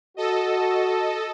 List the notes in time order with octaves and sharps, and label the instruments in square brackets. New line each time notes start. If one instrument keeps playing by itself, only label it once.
[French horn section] F#4 [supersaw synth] A4 D#5